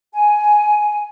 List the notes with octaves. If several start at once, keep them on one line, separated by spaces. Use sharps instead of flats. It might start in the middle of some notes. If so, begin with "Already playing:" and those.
G#5